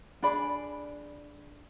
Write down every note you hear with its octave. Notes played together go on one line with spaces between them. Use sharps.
D4 G#4 D5 B5